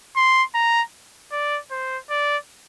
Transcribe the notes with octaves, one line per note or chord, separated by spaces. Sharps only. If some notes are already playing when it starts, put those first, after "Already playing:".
C6
A#5
D5
C5
D5